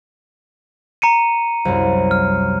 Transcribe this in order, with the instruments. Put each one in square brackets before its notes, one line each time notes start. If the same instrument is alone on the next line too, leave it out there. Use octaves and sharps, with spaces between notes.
[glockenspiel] A#5 C#7 D#7
[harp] C2 F#2
[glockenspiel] F6